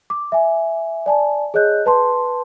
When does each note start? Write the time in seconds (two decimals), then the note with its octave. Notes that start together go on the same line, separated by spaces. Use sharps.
0.10 D6
0.32 E5 G#5
1.06 D5 G#5 A5
1.54 G#4 C#5 D#5 F#6 G6
1.86 B4 A5 C6